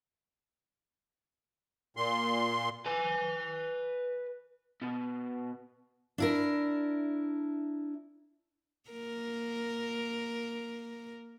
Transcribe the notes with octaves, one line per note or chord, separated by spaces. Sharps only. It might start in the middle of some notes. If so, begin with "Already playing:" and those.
A#2 C6
B4 G#5
B2
D4 E4 A#4
A#3 A#4